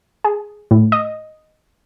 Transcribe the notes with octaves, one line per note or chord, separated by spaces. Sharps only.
G#4
A2
D#5